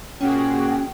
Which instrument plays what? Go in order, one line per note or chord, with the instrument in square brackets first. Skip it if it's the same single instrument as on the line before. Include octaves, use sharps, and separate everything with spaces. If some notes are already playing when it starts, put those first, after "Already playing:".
[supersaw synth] A#2 F#4 G#4 [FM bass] C#4 [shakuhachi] G5